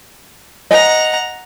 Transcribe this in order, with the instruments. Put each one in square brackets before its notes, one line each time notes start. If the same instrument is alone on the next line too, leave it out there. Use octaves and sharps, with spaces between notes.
[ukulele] D#5 [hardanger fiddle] F#5 A#5